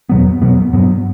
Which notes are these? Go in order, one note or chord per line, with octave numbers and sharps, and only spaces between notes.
E2 B2 F#3 B3
E2 B2 F#3 B3
G2 F#3 B3